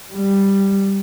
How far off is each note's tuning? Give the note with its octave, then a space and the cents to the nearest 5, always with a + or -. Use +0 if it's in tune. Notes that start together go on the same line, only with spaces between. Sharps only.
G3 +5